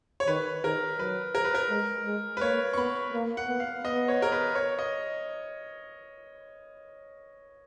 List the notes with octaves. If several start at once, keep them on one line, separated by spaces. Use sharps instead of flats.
C#5
D#3 B4
D#3 A#4
F#3 B4
A#4
B4
A#4
G#3
G#3
B4
A#3 C#5
C#6
B3 B5
A#3
F#5
B3
F5
B3 D#5
C#5
A#4
B4
C#5
D#5